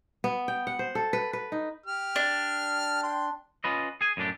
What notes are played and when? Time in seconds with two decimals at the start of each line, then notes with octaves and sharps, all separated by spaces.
0.24 B3
0.48 G5
0.67 F#5
0.79 C5
0.95 A4
1.13 B4
1.33 B4
1.52 D#4
1.86 G4 F6
2.16 D4
3.03 G5 C6
3.64 C#4 F4 B4 D#5
4.01 G#4 G#5
4.17 F#2 A2 D4 G4